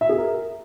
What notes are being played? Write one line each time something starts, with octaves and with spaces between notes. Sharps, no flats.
E5
G#4
A#4